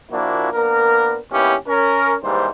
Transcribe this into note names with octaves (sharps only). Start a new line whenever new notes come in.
A#2 F3 A#3 D4 E4 F#4
A#3 B3 D4 A#4
D#2 B3 C#4 E4 G4
C#4 A#4
D#2 G#2 E3 G3 C5